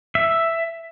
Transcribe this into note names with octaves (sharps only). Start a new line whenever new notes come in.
E5